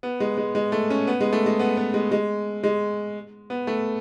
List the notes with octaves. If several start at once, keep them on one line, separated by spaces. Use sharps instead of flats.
B3
G#3
G#3
G#3
A3
C#4
B3
G#3
A3
G#3
B3
B3
G#3
G#3
G#3
B3
A3